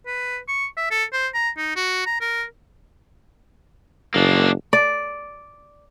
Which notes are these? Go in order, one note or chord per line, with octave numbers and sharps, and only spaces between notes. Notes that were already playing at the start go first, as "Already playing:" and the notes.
B4
C#6
E5
A4
C5
A#5
D#4
F#4
A#5
A#4
F#1 A#3 D4
D5